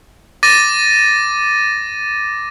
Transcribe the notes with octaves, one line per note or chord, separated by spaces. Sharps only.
D6 A6 A#6 D#7